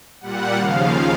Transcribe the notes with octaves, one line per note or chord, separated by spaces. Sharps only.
A#2 G3 F#5
D#2 C#3 F3 F5